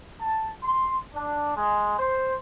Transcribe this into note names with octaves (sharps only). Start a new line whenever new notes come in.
A5
C6
D4
G#3
C5